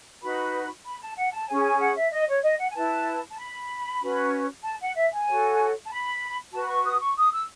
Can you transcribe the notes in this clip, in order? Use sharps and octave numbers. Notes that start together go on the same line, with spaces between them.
D#4 F#4 B4 B5
B5
A5
F#5
A5
C#4 G#4 C#5 G#5
G#5
F#5
E5
D#5
C#5
D#5
F#5
G#5
E4 B4 A5
A5
B5
C#4 F#4 B4
A5
F#5
E5
G#5
F#4 A4 C#5
A5
B5
F#4 B4 A5
B5
C#6
D#6
C#6
D#6
E6